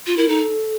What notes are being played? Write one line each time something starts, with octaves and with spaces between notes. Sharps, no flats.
F4
E4 A#4
D#4 A4